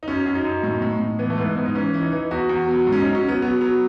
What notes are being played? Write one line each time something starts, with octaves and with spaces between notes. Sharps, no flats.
D#4
F#2 C#4
F#2
D#4
F#2
A2 D#4
A2
A2
E3 B3
A3
G#2 B3
G#2
D#4
E3 C#4
E3
D#4
E3
E2 F#4
E2
F#3
G#2
C#4
F#3 D#4
C#4
F#3
B3
F#3 B3
F#3